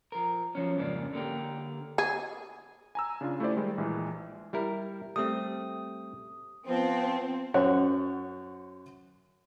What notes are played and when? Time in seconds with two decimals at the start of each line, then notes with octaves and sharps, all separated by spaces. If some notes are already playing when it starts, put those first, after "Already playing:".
0.12 F3 A#4
0.55 F3 F#3 C#4
0.77 F2 G#2 C#3 A#3 D4
1.13 D3 A#3 G4
1.98 G#4
2.95 G#5 A#5 E6
3.21 C#3 D4 F4
3.40 A3 E4 G4 C5 D5
3.56 D#3 G3 G#3
3.78 A#1 E3 G#3
4.53 G3 E4 A#4
5.16 G3 A3 C4 D#6
6.68 F3 B3 C4
7.54 F#2 C5 C#5 F#5